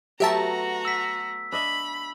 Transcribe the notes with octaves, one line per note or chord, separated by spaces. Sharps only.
F#3 A3 B3 F#4 G4 E5 A5 A#5
E6 B6
D4 D#5 E5 B5